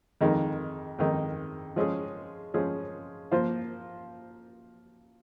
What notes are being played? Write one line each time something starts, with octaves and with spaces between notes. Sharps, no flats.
F2 D#3 G#3 D#4 A#4
F2 D#3 G#3 D#4 A#4
F3 G#3 C#4 G#4
F3 G#3 C#4 G#4
F3 A#3 F4 C5